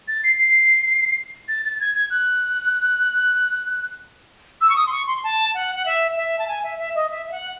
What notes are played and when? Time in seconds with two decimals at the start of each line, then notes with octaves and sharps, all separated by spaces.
0.08 A6
0.24 C7
0.39 C7
1.48 A6
1.64 A6
1.80 G#6
1.95 G#6
2.10 F#6
4.61 E6
4.70 C#6
4.76 D#6
4.87 C6
4.92 C#6
5.07 C6
5.24 A5
5.55 F#5
5.76 F#5
5.86 E5
6.17 E5
6.39 A5
6.48 G#5
6.64 E5
6.79 E5
6.95 D#5
7.11 E5
7.26 E5
7.32 F#5